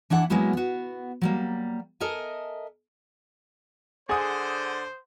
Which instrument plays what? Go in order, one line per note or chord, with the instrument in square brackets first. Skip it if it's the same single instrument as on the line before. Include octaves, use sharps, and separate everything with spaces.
[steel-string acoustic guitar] E3 D4 E4 F#5
F#3 G#3 A#3 B3 E4 F#4
B3 F#4
F#3 G3 A#3
A4 A#4 D#5 E5 G#5
[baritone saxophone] D3 [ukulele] G#4 [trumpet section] C5 [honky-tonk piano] F#5 D#6